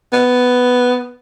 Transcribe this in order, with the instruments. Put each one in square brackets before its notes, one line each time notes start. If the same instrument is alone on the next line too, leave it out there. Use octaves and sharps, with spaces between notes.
[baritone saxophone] B3